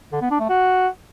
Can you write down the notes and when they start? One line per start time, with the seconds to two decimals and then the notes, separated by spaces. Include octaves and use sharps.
0.12 D3
0.22 B3
0.31 D4
0.40 A3
0.49 F#4